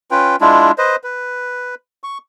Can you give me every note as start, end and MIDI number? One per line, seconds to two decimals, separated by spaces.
0.11 0.36 61
0.11 0.36 65
0.11 0.36 71
0.11 0.36 79
0.41 0.72 56
0.41 0.72 62
0.41 0.72 64
0.41 0.72 65
0.78 0.96 71
0.78 0.96 72
0.78 0.96 75
1.04 1.75 71
2.04 2.18 85